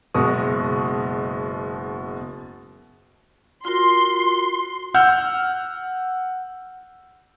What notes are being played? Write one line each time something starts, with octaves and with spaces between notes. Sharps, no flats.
F#1 B2 G#3 C#6 D#6
F4 F#4 A#4 C6
F#5 E6 F6 G6